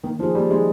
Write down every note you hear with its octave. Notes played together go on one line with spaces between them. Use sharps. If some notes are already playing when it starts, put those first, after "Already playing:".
D#3 A#3
F3 D#4 G#4
G3 A#3
G#3 D#4 G#4